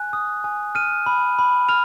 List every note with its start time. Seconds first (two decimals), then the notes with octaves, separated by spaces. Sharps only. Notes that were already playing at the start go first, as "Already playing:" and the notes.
Already playing: G#5 F#6
0.13 D#6
0.44 G#5
0.75 F6 D#7
1.06 B5
1.39 B5
1.69 F6 F7